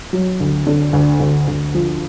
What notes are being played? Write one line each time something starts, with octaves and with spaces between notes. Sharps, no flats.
F#3
D2
D3
D2
D2
D2
F3